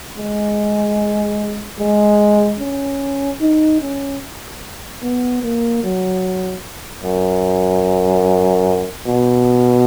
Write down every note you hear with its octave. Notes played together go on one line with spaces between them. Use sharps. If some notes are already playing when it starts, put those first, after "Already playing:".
G#3
G#3
C#4
D#4
C#4
B3
A#3
F#3
F#2
B2